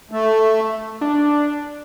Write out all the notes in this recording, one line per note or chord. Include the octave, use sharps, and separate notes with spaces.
A3
D4